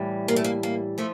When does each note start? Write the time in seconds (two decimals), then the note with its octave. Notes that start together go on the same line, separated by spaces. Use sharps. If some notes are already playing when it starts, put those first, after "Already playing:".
Already playing: A2 E3 G3
0.28 A#3
0.36 A3
0.44 A#3
0.63 A#3
0.98 F3 A3